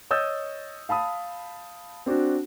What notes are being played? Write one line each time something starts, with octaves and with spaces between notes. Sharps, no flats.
C#5 D#5 D#6 E6 G6 A6
F5 A5 B5 D#6
C4 D4 F#4